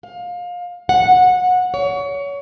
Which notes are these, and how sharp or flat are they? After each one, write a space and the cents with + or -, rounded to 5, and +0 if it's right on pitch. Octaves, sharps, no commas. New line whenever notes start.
F5 +25
F#5 -20
C#5 +30